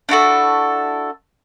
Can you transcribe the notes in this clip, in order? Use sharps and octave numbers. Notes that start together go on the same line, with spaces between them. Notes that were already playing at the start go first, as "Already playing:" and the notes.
D4 E4 F#4 A4